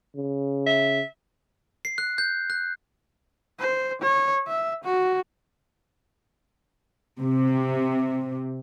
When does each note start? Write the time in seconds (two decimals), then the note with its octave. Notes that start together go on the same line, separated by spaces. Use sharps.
0.16 C#3
0.66 E5
1.85 C7
1.98 F#6
2.18 G6
2.50 F#6
3.60 C5
4.01 C#5
4.48 E5
4.85 F#4
7.20 C3